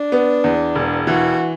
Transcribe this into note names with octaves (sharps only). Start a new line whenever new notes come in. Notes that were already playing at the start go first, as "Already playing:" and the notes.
Already playing: D4
B3
E2
E1
E3 F#4